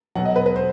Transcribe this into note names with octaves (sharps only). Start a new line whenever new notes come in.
B2 F#3 F#5
D#5
B4
B4
C5